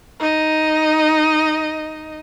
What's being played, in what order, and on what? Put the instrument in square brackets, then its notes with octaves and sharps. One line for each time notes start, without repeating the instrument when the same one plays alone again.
[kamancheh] D#4 D#5